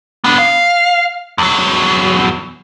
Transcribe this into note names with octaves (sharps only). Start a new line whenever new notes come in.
B3 D4
F5
E2 F#3